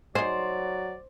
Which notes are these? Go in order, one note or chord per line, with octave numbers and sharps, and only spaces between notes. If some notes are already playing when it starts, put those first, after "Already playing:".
F#3 D#4 G#4 C5 D5